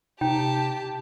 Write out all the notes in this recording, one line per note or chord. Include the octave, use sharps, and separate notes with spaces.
C3 D#4 G4 G5 A5